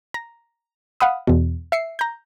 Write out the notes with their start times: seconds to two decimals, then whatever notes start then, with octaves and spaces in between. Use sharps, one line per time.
0.14 A#5
1.00 F5 F#5 B5 D#6
1.27 E2 B2
1.72 E5 C7 C#7
1.99 A#5 G6